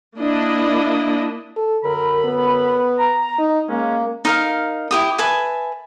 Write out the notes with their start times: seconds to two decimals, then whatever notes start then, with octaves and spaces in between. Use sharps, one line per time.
0.19 A#3 D4 E4 D#5
1.56 A4
1.85 F#2 D3 A#4 B5
2.25 B3
2.99 A#5
3.39 D#4
3.69 G#3 A#3 C#4
4.25 D#4 A#4 F5
4.91 E4 G4 D#6
5.18 B4 E5 G#5 A5